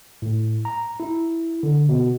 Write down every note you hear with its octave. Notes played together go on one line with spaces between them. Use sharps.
A2
A#5
E4
D3
B2